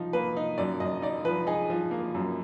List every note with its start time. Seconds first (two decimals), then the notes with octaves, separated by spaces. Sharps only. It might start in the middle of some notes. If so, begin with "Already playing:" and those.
Already playing: F3 D#4
0.13 A#3 B4
0.37 D#4
0.58 F#2 D5
0.80 F#2 D#5
1.02 D#4 D5
1.25 F3 B4
1.47 D#4 G#4
1.70 F3
1.91 A#3
2.14 F#2